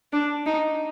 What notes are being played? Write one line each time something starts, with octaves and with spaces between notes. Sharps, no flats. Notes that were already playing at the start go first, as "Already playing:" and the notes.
D4
D#4